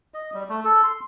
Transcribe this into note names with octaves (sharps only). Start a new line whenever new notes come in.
D#5
G3
A3
A4
C6